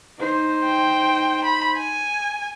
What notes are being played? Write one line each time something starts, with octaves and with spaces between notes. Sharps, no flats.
D#4 C5
G5
B5
G#5